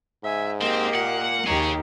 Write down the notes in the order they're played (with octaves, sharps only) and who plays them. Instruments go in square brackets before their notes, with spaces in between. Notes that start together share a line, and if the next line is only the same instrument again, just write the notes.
[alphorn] G#2 [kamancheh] E5 G#5
[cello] A#3 [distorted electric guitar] C4 [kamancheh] G4 D#5
[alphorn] A#2 [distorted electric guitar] F#5
[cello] D#2 [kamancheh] D#4 G4 [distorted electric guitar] G#4 C#5